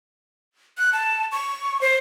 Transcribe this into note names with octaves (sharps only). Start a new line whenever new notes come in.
F#6
A5
C#6
C5